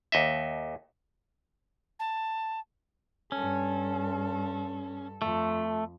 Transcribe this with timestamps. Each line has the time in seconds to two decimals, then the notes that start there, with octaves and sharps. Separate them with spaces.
0.12 D#2 D#5 E5
1.99 A5
3.32 G2 C#4 A4
5.22 F2 A3